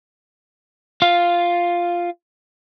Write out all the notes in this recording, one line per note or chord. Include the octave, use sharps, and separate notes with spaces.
F4 F5